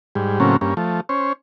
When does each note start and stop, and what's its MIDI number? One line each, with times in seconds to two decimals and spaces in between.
0.15 0.39 44
0.15 0.39 55
0.40 0.57 45
0.40 0.57 49
0.40 0.57 54
0.40 0.57 58
0.40 0.57 60
0.40 0.57 61
0.61 0.74 43
0.61 0.74 58
0.61 0.74 61
0.77 1.01 53
0.77 1.01 57
1.09 1.33 61
1.09 1.33 72
1.09 1.33 73